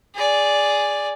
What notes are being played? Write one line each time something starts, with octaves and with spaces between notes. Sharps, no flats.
G#4 D5